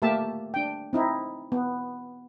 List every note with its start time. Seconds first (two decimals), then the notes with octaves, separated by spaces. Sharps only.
0.02 A3 A#3 G4 E5 A5
0.54 D4 G5
0.93 C4 D#4 E4
1.52 B3